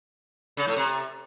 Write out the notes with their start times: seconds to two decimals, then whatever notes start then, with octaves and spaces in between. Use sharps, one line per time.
0.57 C#3
0.67 A2
0.77 C3